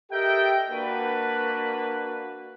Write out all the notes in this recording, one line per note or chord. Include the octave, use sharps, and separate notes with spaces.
G4 A4 A#4 D#5 E5 G5
A#3 D4 F#4 B4